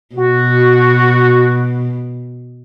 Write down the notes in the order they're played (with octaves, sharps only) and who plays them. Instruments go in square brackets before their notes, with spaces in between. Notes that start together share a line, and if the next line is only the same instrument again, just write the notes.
[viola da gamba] B2 [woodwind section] F#4